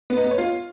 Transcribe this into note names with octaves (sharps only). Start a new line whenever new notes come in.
B3
D#4
B3
C#5
F4